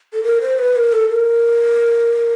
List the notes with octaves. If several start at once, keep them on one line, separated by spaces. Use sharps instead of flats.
A4
A#4
C5
B4
A#4
A4
A#4